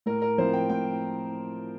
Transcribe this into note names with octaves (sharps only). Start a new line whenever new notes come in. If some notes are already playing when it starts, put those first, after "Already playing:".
A2 A#4
A#4
F3 C4 E4 C5
G5
A2 G5